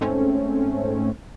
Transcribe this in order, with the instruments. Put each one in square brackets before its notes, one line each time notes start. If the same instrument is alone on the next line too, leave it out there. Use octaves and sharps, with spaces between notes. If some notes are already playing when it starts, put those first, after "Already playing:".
[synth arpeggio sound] G#2 A3 C4 C#4